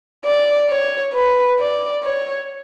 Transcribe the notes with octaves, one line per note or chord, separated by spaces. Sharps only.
D5
C#5
B4
D5
C#5